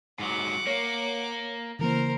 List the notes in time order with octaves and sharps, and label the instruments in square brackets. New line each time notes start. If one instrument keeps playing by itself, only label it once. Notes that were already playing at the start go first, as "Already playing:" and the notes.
[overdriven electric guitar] G#2 F#3 [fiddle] F#5 D6
[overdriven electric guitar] A#3 [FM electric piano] C#5
[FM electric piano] C#3 E3 A#3 [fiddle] A#4 C5